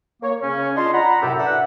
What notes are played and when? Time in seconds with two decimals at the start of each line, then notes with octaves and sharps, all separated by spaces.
0.22 A#3 C#5
0.42 C#3 C#4
0.76 D4 F4 D#5 A5 C6
0.94 F#5 A#5 B5
1.22 F#2 A2 C3 G4 A4 F#5
1.39 D4 B4 E5 F#5